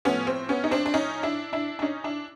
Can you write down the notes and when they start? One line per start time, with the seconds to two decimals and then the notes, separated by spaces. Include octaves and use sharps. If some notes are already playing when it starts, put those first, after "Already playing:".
0.05 A2 F3 A3 B3 C#4
0.27 C4
0.49 B3 C#4
0.64 D#4
0.71 C4 D4
0.86 D4
0.94 C#4 D#4
1.23 D4 E4
1.53 D4 E4
1.79 D4
1.82 C#4 D#4
2.04 D4 E4